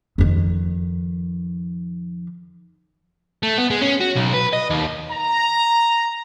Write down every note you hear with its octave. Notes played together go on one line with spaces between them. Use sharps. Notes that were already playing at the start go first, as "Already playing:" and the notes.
F2 D#3
A3
B3
G#3
C#4
F#4
B1
B4
D#5
D#2
A#5